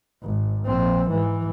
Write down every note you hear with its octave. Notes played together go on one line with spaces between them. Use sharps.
G#1
A#1 C4
G#2 E3